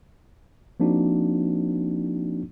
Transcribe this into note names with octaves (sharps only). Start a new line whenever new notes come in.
F3 A#3 C4 D4 D#4 F#4